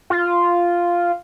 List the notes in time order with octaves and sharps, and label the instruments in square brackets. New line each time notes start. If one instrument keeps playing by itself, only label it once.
[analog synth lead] F4